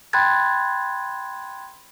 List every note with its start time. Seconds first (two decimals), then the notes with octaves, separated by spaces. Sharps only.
0.13 G5 B5 C6 F#6 G#6 A6